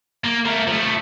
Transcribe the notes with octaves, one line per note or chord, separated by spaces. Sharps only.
A#3
A3 A#4
F3 A3